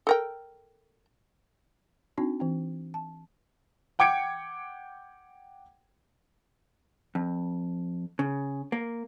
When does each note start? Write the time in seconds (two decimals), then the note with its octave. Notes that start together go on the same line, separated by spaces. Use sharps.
0.07 A4 A#4 G5
2.18 C4 D4 D#4 F#4
2.40 E3 C4
2.94 A5
3.99 F#5 G5 D6 G#6 C#7 D7
7.15 F2
8.19 C#3
8.72 A#3